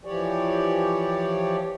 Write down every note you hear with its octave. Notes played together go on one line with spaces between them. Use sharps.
E3 F3 G4 C#5 D5